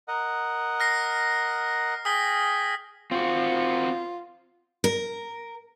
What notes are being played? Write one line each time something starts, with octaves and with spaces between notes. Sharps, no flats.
A#4 D#5 F#5
F6 A#6 C7
G#4 G5 G#5 D#6 B6 G7
C4 F4 F#4
A#4